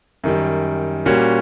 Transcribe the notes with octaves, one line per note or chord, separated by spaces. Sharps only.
F#2 D#3 G3
A#2 G3 A#3 C#4 F#4